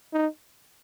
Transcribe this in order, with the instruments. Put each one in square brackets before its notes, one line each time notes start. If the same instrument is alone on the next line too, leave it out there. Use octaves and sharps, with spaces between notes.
[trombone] D#4